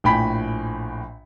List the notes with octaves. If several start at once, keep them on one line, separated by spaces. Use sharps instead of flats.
A#1 A2 G5 G#5 B5 B6